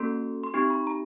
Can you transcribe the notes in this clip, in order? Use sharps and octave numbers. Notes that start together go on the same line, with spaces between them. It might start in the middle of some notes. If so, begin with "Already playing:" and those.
Already playing: A#3 C#4 F#4 A4 C6
C6
C4 D#4 G4 C#6
B5
A#5